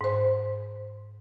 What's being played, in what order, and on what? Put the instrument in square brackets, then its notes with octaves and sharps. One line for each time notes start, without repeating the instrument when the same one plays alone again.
[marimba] G#2 C5